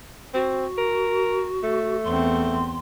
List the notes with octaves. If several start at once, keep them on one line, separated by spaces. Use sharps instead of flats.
C4 F#4
A#4
A3
E2 C4 C6